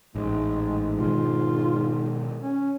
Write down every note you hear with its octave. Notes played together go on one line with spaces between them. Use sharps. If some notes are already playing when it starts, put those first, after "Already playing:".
A1 G#2 G#3
B2 D#3 G#3 F4
C#4